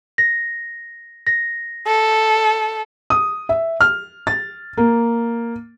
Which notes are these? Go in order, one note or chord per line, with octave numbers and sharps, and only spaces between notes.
A#6
A#6
A4
D#6
E5
F6
A6
A#3